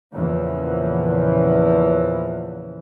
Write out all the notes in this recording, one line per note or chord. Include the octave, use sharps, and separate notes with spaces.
E2 A#2 C#3 E3 F3